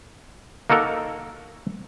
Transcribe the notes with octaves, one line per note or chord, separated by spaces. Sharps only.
A#3 D#4 F#4 A4 A#4